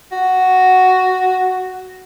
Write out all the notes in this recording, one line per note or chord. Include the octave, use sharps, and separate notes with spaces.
F#4